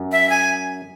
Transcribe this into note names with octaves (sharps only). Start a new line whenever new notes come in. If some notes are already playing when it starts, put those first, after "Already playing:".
Already playing: F#2
E5
G#5